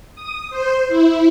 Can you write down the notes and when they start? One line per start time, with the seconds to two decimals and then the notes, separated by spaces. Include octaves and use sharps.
0.15 D#6
0.50 C5
0.88 E4